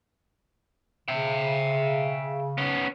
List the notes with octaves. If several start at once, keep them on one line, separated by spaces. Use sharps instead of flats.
C#3 E5 G5
B3 C#4